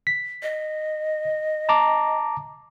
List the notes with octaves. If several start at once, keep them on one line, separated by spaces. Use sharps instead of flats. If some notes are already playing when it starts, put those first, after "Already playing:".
B6
D#5
A5 A#5 D6